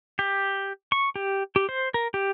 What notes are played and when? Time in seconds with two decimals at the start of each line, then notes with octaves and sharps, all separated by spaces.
0.19 G4
0.92 C#6
1.16 G4
1.56 G4
1.69 C5
1.94 A#4
2.14 G4